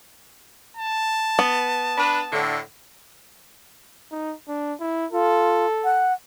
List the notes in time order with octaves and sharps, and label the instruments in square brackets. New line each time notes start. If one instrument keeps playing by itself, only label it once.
[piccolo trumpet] A5
[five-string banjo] B3
[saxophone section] D4 B4
A2 D3
[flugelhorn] D#4
D4
E4
[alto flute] F4 [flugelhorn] A4
[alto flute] F#5